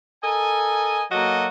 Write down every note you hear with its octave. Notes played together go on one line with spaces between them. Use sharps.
A4 A#4 D#5 G#5
F#3 A#3 F#4 A4 D#5